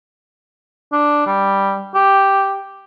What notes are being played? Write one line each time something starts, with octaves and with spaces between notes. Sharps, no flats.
D4
G3
G4